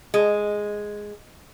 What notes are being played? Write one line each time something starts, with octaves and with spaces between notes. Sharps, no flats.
G#3